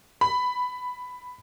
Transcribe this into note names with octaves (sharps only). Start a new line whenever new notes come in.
B5